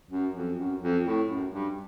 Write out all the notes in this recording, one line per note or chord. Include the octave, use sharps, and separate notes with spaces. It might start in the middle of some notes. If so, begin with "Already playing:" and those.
F#2
F2
F#2
F2
A2
F#2
G2